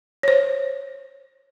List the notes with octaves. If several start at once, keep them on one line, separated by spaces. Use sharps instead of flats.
C5 C#5